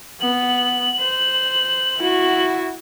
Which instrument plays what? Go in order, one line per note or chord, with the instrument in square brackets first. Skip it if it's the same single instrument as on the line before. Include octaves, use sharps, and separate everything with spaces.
[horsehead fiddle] B3 [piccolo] F#7
[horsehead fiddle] C5
E4 F#4